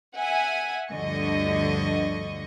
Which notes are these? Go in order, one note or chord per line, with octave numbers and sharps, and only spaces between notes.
E5 F#5 G#5
D2 G2 D3 F3 D#5 C#6